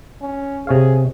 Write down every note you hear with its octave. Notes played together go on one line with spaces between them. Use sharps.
C#4
C3 G#4 C#5 F5